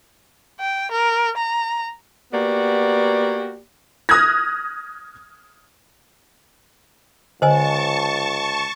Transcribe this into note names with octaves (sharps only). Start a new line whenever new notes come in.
G5
A#4
A#5
A#3 B3 F#4 G4 D5
D#6 F6 F#6 G#6 A#6
C#2 D3 C5 D#5 G#5 A5 C#6